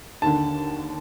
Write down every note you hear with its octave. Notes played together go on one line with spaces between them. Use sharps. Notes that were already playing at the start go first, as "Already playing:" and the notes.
D#2 D3 A5